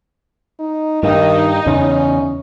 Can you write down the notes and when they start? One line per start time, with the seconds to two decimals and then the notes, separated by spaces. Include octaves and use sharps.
0.59 D#4
1.03 G2 D#3 D#4
1.67 E2 C#3 C#4